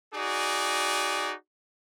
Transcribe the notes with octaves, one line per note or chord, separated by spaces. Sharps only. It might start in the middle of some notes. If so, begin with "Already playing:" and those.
D#4 F#4 G#4 D5